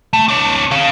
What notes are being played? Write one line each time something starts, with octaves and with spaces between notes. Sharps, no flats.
A3
D4 C#5
G#4 F5